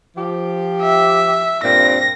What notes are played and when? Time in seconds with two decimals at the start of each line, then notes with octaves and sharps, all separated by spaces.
0.16 F3 G4
0.82 E5
1.63 G2 A#2 C4 A#6